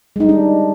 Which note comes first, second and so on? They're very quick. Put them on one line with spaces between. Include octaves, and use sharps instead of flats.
G#3 D#4 G3 D4